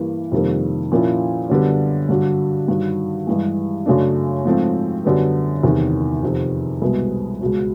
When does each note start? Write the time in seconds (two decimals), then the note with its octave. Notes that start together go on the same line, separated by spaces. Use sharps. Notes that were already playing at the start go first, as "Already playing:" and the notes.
Already playing: G2 E3 G3 A#3
0.32 F2 C3 D#3 G3 A#3
0.92 A#2 F3 A#3 C#4 E4
1.50 F#2 D3 G3 B3
2.09 G2 D3 F#3
2.68 G2 D#3 F#3
3.27 G2 E3 G#3
3.86 F#2 C#3 F#3 A3 D4
4.45 G#2 F3 A3 C4
5.05 F#2 D3 G3 B3
5.63 E2 C3 D#3 G3
6.23 F2 C3 D#3
6.82 C2 B2 G#3 B3
7.41 C#2 B2 F#3